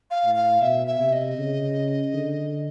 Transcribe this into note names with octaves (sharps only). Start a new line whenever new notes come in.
F5
A2
F5
B2 E5
E5
C3
D#5
C#3
D3